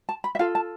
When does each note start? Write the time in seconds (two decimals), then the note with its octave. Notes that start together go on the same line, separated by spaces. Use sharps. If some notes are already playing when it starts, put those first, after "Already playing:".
0.09 A5
0.24 B5
0.35 E5
0.39 F4 A4 F5
0.55 A5